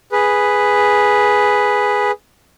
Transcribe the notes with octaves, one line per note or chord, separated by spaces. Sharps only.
G#4 B4